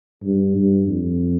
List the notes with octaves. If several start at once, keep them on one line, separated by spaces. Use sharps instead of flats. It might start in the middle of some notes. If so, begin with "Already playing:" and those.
G2
G2
F2